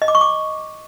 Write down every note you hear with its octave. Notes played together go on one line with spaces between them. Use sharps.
D#5
D6
C#6
D6